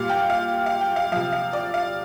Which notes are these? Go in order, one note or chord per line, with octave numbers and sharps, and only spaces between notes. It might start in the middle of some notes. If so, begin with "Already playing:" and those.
Already playing: A#2 G3 F5
G5
F5
F5
G5
F5
C3 F3 F5
F5
D5
F5